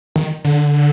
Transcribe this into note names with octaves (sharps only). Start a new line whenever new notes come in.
D#3
D3